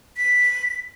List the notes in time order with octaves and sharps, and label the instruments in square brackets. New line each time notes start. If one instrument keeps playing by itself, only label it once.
[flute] B6